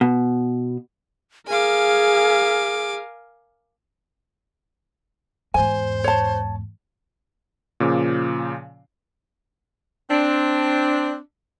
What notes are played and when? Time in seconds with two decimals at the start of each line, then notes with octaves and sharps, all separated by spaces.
0.01 B2
1.48 G#4 A#4 F5 G#5 D6
5.54 E2 G#2 C5 G#5
6.04 C#5 A5
7.80 A#2 C#3 F3 D6
10.10 C4 D4